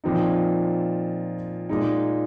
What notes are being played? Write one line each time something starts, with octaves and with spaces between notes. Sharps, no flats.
A#2 F3 C4 D#4
A#2 G#3 D#4